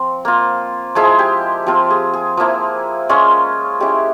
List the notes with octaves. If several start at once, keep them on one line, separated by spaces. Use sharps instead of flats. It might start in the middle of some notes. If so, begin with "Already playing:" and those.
Already playing: F3 C4
A#3 F4
F3 G#3 E4 G#4
G4
F3 C4 F4 G4
G#4
G#4
F3 A#3 E4
G#3 C#4 F4
G#3 C#4 E4 G4